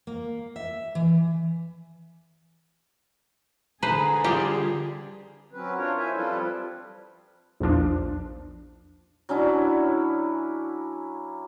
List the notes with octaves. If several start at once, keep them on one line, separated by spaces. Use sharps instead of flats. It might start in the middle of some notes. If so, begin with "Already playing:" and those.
A#3
E5
E3
D3 G#4 B4 C5 A#5
G3 F4 G4
F#3 C4 C#4 B4
D4 F4 A#4 C#5
E4 C5 E5 G#5
F3 G3 C4 F4 A4 B4
A#1 E2 F3 D4
F#3 C#4 D4 E4